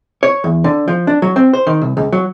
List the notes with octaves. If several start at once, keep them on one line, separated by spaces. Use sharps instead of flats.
C#5
E2
D3
F3
D4
F#3
C4
C5
D#3
C2
C#2
F#3